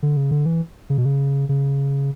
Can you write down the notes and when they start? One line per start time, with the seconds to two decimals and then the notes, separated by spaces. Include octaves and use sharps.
0.03 D3
0.17 C#3
0.31 D3
0.46 E3
0.90 C#3
0.98 B2
1.05 C#3
1.49 C#3